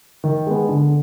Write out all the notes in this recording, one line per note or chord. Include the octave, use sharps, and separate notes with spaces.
D#3
G#3 B3
D3